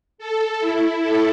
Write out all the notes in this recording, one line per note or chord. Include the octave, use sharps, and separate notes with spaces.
A4
E4
A4